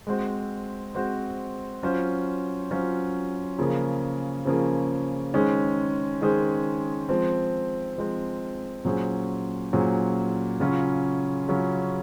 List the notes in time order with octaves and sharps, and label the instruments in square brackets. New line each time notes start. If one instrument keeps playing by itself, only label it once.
[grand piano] G#3 C4 F#4 C5
G#3 C4 F#4 C5
F#3 C#4 F4 C5
F#3 C#4 F4 C5
C#3 F3 A#3 C#4 G#4
C#3 F3 A#3 C#4 G#4
D#3 G#3 C#4 G#4 C5
D#3 G#3 C#4 G#4 C5
F3 G#3 C4
F3 G#3 C4
A#2 F#3 C#4 G#4 C5
A#2 F#3 C#4 G#4 C5
C#3 F#3 C#4 F4
C#3 F#3 C#4 F4